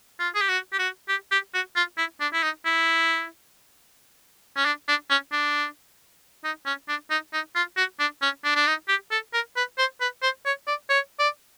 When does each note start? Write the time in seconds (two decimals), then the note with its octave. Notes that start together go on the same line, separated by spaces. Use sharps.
0.20 F4
0.35 G#4
0.41 G4
0.49 F#4
0.73 G4
0.79 F#4
1.09 G4
1.31 G4
1.54 F#4
1.76 F4
1.98 E4
2.21 D4
2.33 E4
2.43 D#4
2.65 E4
4.57 C#4
4.65 D4
4.88 D4
5.10 C#4
5.32 D4
6.44 D#4
6.66 C#4
6.88 D4
7.10 D#4
7.33 D#4
7.56 F4
7.77 F#4
7.99 D4
8.22 C#4
8.44 D4
8.56 D4
8.67 D#4
8.88 G4
9.11 A4
9.34 A#4
9.56 B4
9.78 C5
10.01 B4
10.22 C5
10.46 C#5
10.67 D5
10.90 C#5
11.19 D5